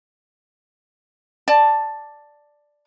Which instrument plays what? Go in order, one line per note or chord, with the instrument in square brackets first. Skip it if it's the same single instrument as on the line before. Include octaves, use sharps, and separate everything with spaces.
[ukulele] D5 A5